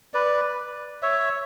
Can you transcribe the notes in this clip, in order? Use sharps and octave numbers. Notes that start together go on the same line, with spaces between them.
B4 D5
C#5 E5